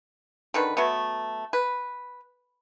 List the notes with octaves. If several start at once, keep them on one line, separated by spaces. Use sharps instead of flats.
D3 D#3 B4
F#3 A3 B3
B4